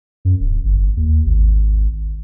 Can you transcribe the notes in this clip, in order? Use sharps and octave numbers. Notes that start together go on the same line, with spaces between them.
F#2
D1
G1
D#2
G#1